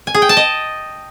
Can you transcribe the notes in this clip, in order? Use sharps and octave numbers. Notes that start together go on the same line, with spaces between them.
G#5
G#4
G5
A5
D#5